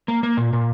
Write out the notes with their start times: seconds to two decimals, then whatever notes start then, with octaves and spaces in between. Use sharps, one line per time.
0.08 A#3
0.23 A#3
0.37 A#2
0.53 A#2